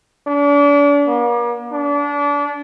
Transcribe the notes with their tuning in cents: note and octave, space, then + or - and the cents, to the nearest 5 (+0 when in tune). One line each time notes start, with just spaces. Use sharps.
D4 -40
A#3 +40
D4 -30